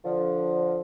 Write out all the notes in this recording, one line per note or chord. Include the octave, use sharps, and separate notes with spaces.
D3 F3